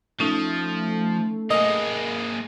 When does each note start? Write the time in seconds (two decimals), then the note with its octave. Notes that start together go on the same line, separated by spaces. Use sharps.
0.20 F3 A3 C#4 D#4
1.50 A#3 G#4 D#5